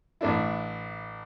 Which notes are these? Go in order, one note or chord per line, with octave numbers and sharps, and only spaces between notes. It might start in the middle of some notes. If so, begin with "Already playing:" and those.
A1 A3 D4 E4